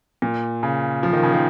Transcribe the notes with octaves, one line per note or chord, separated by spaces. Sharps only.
A#2
C#3
F3
D#3
C#3
D#3